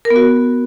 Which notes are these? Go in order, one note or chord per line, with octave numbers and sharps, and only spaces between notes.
A#4
B3
F#4